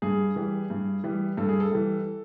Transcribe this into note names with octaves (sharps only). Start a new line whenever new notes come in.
G2 G#4
E3 G3
G2
E3 G3
G2 A4
G#4
A4
E3 G3